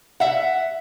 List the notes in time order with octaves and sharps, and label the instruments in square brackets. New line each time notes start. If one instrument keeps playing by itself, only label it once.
[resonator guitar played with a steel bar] E5 F#5